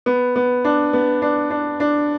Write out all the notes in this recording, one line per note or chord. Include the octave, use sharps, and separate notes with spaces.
B3
B3
D4
B3
D4
D4
D4